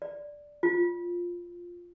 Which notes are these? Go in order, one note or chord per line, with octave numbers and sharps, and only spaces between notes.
D5
F4